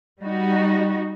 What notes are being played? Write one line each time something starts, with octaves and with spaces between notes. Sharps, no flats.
G3 D#4 F#4